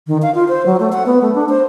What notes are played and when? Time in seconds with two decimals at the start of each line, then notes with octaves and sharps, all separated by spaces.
0.07 D#3
0.23 F5
0.35 F4
0.48 C5
0.66 F#3
0.80 A3
0.92 F#5
1.06 B3
1.22 A3
1.35 D4
1.49 C5